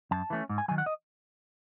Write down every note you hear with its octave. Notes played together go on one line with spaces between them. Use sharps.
F#2 A5
E3 A3 C#4
G#2
G#5
D#3 F#3 G#5
F#5
D#5